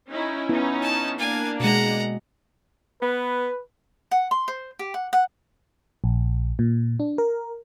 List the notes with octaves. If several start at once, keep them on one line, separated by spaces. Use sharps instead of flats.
C#4 D#4 E4
B3 C#4 D#4 E4
A5
A#3 D4 F5 G#5
B2 G#3 F#5 A#5
B3 B4
F#5
C6
C5
G4
F#5
F#5
A#1
A#2
D4
A#4